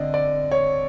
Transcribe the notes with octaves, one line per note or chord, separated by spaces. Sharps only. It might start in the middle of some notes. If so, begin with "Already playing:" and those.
Already playing: D3 C4 D5 D#5
D5
C#5